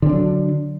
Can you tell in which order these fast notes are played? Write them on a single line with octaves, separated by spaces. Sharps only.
D3 C4 D4 F#3